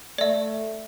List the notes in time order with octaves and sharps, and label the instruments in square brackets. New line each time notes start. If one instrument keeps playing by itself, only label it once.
[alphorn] A3 [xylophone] D5 E5